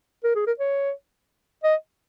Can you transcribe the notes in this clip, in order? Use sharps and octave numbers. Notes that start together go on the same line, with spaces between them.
A#4
G#4
A#4
C#5
D#5